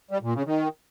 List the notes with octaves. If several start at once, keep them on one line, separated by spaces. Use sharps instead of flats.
G3
A#2
C#3
D#3